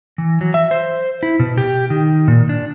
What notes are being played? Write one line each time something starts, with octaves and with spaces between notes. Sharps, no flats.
E3
F#3
E5
C5
E4
B2
G4
D#3
A#2
D4